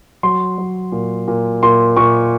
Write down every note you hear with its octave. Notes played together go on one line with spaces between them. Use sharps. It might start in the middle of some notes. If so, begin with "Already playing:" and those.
F#3 C6
F#3
A#2
A#2
A#2 C6
A#2 C#6